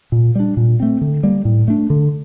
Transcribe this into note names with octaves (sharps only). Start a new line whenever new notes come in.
A#2
G3 D4
A#2
A3 C4
D3
G3 A#3
A2
A3 D4
D3